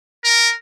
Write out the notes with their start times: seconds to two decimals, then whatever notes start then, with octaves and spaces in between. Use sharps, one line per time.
0.24 A#4